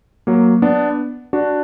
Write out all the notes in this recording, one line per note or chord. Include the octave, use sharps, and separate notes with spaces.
F#3 A#3
B3 D4
D4 F#4